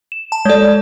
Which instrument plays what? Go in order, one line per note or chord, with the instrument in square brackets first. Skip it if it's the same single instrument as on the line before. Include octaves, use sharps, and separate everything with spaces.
[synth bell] E7
A5
[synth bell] G#3 A4 [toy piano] C#5 D5